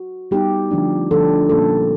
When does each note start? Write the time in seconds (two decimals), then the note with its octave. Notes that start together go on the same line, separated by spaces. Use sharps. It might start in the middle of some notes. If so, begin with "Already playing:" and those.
Already playing: F#4
0.31 G3 B3 D#4 G4
0.71 D3 F3 A3 D4
1.11 D3 F3 A3 D4 A4
1.49 A#2 G3 A#3 C#4 A4